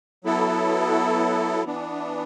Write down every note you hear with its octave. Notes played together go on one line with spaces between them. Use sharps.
F#3 B3 E4 A4
E3 B3 D4